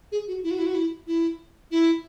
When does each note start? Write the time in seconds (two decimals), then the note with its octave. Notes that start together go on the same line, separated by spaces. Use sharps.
0.12 G#4
0.28 F#4
0.44 E4
0.51 F#4
0.59 E4
0.66 F#4
0.75 E4
1.07 E4
1.71 E4